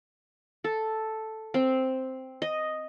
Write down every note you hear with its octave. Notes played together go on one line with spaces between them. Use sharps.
A4
C4
D#5